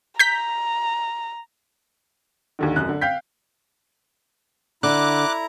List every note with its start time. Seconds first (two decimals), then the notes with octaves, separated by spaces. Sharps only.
0.19 A#5 G6 B6
2.59 D#2 D3 D#3
2.76 F1 F#2 F#6
2.89 D3
3.01 F5 G5 G6 B6
4.83 D3 E4 A#5 D6 F#6